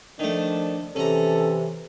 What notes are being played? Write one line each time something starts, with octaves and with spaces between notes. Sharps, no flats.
D#3 F3 A3 D4
C3 E3 C#4 A4 A#5